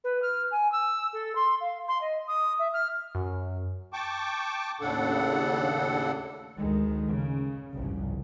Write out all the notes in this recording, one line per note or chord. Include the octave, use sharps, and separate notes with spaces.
B4
F6
G#5
E6
A4
C6
F5
C6
D#5
D#6
E5
F6
F#2
G5 A5 C#6 D6
D#2 A2 C#3 D4 A4 F#5
D2 D#3 G#3
C#3
G1 C2 F2 G#2 C#3